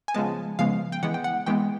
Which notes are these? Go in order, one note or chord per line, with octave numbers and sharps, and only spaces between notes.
G#5
C#3 F3 G#3 B3 A5
C#3 F3 G#3 B3 F5
G5
E3 G#3 B3 F#5
G5
F#5
E3 G#3 B3 G5